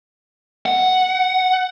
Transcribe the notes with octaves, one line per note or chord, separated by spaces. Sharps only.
F#5